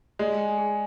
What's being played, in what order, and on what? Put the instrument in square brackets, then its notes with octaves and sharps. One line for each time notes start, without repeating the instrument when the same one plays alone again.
[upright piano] G#3 [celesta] D5
[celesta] G#5
G#4